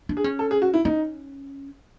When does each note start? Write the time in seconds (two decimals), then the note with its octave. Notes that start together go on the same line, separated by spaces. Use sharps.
0.09 D4
0.17 G#4
0.24 C#4
0.39 A4
0.51 G#4
0.62 F#4
0.74 E4
0.85 C#4 D#4